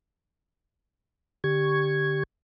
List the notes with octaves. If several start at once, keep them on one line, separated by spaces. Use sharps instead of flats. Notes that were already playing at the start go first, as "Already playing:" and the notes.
D3 G4 C#6 G#6